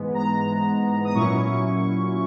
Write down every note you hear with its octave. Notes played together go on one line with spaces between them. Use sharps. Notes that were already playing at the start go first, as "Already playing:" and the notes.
Already playing: G#2 E3 G#3 B3
A#5
D#6
A#2 F#3 C#4 E4 C#6